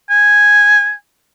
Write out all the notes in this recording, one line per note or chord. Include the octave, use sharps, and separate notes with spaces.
G#5